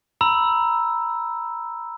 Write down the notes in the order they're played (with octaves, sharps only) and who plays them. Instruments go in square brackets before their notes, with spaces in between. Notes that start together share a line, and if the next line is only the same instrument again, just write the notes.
[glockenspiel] A#5 B5 E6